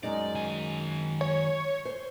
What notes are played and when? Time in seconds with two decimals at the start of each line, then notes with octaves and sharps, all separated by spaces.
0.03 F#2 G#3 D#4 D5
0.35 D#3 G#5
1.21 C#5
1.85 C5